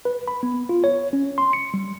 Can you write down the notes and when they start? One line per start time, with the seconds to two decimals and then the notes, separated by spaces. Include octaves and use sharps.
0.05 B4
0.28 B5
0.43 B3
0.69 F4
0.84 C#5
1.13 C#4
1.38 C6
1.53 C#7
1.74 G3